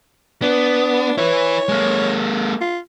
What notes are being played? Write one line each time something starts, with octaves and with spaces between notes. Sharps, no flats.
B3 D4
E4 B4 C#5
G#3 A#3
F4